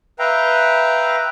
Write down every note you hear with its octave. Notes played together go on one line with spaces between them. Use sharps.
B4 E5 F5 G5 A#5